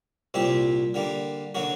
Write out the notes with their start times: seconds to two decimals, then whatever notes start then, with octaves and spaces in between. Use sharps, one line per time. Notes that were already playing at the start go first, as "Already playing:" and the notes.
0.34 C2 A#2 G3 C4 G4
0.94 D3 G3 A#3
1.55 D3 F#3 A#3 F#4